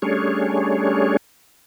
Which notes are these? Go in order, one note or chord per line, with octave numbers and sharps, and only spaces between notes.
G3 A3 C#4 D4 G#4 C#5